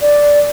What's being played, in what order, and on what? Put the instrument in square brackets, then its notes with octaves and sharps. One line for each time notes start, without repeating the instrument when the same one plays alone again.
[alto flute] D5